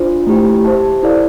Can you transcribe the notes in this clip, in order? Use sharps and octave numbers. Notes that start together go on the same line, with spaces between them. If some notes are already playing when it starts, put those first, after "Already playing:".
Already playing: D4 F4 C5
A3 E4 G4
G4 C5 E5 A5
E4 A4 D5 F5